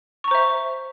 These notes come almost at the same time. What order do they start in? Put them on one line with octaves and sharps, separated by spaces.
C#6 A#5 C5 E5